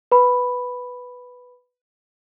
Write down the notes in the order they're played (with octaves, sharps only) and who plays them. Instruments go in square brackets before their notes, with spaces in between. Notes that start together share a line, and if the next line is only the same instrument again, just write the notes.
[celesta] B4 B5